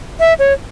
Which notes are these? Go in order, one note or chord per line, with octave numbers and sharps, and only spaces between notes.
E5
C#5